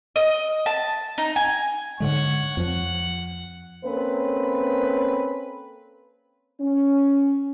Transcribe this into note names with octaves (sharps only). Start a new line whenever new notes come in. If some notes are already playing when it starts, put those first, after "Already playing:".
D#5
A5
D#4
G#5
G#2 D3 G#3 C#5 F#5
F2 F3 F#5
A#3 C4 C#4 A4 B4
C#4